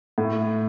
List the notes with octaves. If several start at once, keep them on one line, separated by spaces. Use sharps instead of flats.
A2